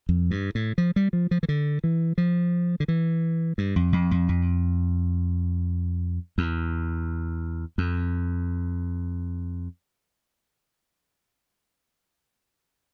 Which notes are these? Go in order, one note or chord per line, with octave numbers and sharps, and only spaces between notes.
F2
G2
A2
F3
G3
F3
F3
E3
D3
E3
F3
D3
E3
G2
F2
F2
F2
F2
E2
F2